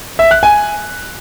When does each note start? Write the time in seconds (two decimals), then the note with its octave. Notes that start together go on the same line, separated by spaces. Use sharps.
0.19 E5
0.31 F#6
0.43 G#5